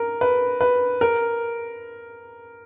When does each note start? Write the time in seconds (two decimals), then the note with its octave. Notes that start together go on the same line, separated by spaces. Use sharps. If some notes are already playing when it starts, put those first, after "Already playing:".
Already playing: A#4
0.21 B4
0.61 B4
1.01 A#4